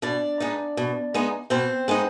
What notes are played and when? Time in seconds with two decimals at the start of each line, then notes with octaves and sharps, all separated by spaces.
0.02 B2 D4 D5
0.40 G#3 B3 D#4
0.77 B2
1.14 G#3 B3 D#4
1.50 B2 C4 C5
1.88 G#3 B3 D#4